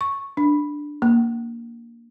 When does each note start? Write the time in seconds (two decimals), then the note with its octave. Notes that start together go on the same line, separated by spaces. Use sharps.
0.01 C#6
0.37 D4
1.02 A#3